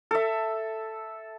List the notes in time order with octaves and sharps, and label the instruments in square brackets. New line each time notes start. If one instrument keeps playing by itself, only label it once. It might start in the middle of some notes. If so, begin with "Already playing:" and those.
[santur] A4 E5